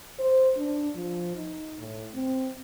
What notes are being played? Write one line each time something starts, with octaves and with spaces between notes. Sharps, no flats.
C5
D4
F3
D#4
A2
C4